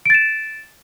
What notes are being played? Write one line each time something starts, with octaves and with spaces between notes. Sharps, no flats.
A6 D7 E7